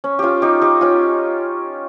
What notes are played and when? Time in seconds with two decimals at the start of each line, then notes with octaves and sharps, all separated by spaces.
0.04 C#4
0.19 C#4 F4 G4
0.42 D#4 G4
0.61 D#4 G4
0.81 C#4 F4